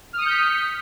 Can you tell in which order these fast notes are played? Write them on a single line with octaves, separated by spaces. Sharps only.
F6 D#6 C#7 G6 B6